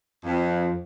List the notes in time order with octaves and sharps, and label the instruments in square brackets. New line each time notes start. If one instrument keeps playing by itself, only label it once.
[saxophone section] F2